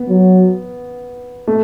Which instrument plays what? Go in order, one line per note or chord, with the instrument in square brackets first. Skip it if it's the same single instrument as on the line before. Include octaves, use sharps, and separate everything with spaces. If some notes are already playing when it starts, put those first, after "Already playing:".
Already playing: [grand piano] B3
[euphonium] F#3
[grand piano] A3